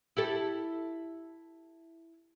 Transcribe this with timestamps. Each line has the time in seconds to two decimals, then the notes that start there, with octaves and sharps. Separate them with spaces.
0.17 E4 G4 A4